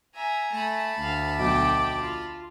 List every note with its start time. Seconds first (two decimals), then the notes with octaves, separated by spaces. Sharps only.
0.15 E5 G#5 A#5
0.52 A3 A5 B5
1.01 D2 F5
1.39 B1 G5 D6
2.00 F4